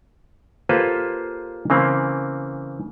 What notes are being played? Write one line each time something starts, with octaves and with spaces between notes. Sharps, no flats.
A#3 F4 G4 A4 B4 C5
C#3 E3 A#3 C4